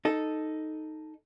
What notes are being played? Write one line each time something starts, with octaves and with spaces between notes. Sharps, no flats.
D#4 A4